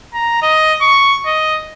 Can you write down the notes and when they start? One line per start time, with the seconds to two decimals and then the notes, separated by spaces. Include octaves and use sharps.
0.14 A#5
0.42 D#5
0.82 C#6
1.26 D#5